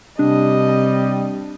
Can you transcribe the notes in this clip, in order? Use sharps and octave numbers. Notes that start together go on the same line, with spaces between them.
C3 G3 D4 D#5